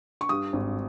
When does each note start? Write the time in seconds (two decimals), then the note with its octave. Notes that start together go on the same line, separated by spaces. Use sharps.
0.21 C#6
0.29 G2 D#6
0.53 G#1